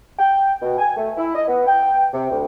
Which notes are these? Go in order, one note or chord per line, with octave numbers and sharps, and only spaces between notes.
G5
B2
G#5
A3
E4
D#5
B3
G5
C3
D2